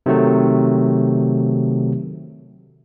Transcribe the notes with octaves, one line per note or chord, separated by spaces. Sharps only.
C3 D#3 F#3 A3